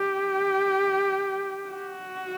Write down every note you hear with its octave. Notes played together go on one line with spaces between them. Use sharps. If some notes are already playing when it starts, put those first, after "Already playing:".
Already playing: G4
F#4